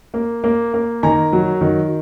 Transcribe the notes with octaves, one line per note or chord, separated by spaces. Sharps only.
A#3
A#3
A#3
D#3 G#5 A#5
F#3
D#3